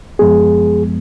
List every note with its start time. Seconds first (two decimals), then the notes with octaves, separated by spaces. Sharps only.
0.19 F#2 F3 G#3 B3 G#4